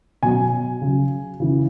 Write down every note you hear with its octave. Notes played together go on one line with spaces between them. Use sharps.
B2 F#3 G#5
C#3 F#3
C#3 E3